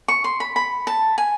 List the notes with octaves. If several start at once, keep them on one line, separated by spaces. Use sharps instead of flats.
C#6
C6
B5
B5
A5
G#5